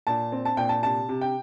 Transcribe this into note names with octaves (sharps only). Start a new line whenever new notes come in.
A#2 A5
C4
A5
A#2 G5
A5
C3 A5
C3
G5